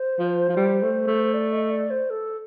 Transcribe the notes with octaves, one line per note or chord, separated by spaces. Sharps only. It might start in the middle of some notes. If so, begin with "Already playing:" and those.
Already playing: C5
F3
F3
G3
A3
A3
D5
D#5
D5
C5
A4